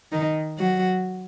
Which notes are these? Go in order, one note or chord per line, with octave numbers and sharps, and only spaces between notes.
D#3 D#4
F#3 F#4